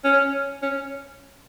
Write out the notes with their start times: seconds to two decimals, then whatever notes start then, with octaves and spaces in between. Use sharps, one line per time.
0.05 C#4
0.62 C#4